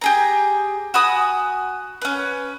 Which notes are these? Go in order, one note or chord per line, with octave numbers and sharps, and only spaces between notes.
G4 G#4 A#5
F#4 G#5 B5 D#6
C#4 B4